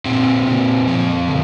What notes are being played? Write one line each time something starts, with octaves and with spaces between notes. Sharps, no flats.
A#2 C4
A#2
F3
D3